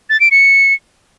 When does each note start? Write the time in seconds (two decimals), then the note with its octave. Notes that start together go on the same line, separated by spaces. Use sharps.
0.10 A6
0.20 D7
0.31 C#7